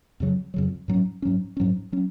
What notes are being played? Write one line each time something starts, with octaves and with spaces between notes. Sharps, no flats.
F2 C#3 F#3
F2 C#3 F#3
G#2 F#3 C#4
G#2 F#3 C#4
G#2 F#3 C#4
F#3 C#4